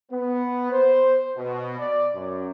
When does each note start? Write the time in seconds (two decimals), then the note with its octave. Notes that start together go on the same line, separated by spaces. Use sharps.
0.11 B3
0.72 C5
1.36 B2
1.78 D5
2.14 F#2